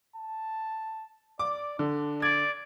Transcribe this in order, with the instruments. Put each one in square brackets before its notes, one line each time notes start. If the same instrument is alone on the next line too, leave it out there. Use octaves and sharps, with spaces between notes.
[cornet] A5
[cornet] D5 [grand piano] D6
[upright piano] D3 [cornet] D4
[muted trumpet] D5 [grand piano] G#6